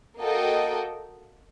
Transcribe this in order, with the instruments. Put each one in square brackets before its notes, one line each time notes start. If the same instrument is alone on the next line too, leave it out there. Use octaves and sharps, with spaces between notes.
[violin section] A#3 F#4 A4 D#5 G5